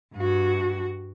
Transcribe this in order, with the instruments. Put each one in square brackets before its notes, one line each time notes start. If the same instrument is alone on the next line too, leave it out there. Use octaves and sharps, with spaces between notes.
[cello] G2 F#4